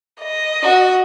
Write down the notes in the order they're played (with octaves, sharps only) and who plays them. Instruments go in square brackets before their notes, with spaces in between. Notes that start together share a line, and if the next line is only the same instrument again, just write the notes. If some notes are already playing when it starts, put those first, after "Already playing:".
[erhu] D#5
[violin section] F#4